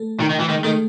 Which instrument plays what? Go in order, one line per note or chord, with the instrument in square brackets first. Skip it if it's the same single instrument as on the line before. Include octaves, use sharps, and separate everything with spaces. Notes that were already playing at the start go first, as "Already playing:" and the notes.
Already playing: [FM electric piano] A3 A4
[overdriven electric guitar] D#3
D#3
E3
[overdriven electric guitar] D#3 [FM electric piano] G#3 G#4
[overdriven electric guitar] D#3 [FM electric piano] A3 A4